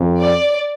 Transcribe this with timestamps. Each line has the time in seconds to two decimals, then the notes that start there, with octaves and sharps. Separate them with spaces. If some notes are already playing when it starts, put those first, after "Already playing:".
Already playing: F2
0.20 D5